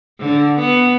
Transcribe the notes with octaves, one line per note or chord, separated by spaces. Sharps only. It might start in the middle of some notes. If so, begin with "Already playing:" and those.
D3
B3